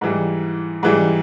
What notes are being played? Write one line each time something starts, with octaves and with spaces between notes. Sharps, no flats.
G#2 E3 G3
G#2 E3 G3